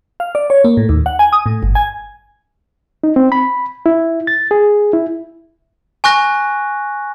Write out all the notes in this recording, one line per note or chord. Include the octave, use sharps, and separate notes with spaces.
F5
D5
C#5
A#3
A2
D#2
F#5
G#5
D#6
A2
G1
G#5
D#4
C4
B5
E4
A6
G#4
E4
G#5 C#6 F#6 A#6